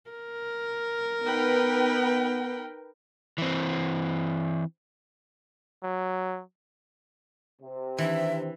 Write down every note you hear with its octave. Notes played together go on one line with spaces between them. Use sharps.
A#4
B3 D#4 B4 G5
E3 C4
F#3
C3
D#3 E3 D4 E5